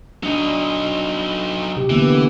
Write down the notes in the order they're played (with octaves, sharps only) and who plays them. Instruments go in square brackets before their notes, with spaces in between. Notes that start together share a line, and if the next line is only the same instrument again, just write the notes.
[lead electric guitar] F#3 D#4 [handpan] D4
[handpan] C3 G4
[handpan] D3 A#3 B3 [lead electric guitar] E3